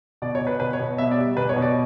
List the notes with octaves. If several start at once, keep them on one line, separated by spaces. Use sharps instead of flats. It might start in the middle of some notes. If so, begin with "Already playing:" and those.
B2 D5
C#5
B2
B4
B2 B4
C#5
B2
B3 E5
D5
G3
B2 B4
C#5
B2
D5